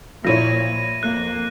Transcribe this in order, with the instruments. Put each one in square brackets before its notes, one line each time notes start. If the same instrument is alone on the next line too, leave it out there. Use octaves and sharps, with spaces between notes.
[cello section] A#2 [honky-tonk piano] F3 E4 C#5 [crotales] A#6 D#7
[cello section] F2 A#3 [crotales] F#6